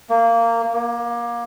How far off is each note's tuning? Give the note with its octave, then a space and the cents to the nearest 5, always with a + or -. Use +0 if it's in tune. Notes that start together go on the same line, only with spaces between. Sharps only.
A#3 -15
A#3 +25